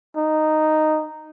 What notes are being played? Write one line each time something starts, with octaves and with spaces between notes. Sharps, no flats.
D#4